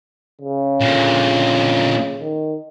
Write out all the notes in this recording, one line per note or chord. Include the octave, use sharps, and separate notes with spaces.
C#3
A#2 D3
D#3